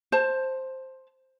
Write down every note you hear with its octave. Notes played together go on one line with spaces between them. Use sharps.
C5 A5